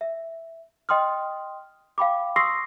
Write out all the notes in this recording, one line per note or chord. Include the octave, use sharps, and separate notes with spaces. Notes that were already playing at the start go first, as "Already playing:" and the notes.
E5
D#5 G5 C6 D#6 F6
F5 G5 B5 D6
C6 C#6 D#6 E6 A#6 C7